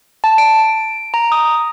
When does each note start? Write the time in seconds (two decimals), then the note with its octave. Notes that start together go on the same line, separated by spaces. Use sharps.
0.24 A5
0.38 D7
1.14 A#5
1.32 D#6